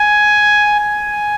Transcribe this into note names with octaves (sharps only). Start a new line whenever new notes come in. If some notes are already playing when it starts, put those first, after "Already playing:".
Already playing: G#5
G#5